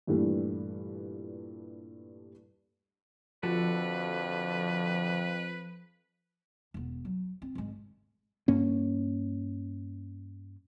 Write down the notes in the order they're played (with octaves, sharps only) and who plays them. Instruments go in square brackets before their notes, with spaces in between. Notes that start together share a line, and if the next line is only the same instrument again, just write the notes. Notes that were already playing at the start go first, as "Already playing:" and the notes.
[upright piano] G2 A#2 E3 G3 A3 D4
[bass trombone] F2 [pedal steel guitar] D3 F#4 A4 [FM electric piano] F3 [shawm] B4
[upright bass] E1 B3
F#3
C4
G#1 G#3
[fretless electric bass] G2 A#3 C#4